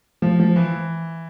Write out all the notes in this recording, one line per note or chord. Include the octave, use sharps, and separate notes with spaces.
F3
F3
E3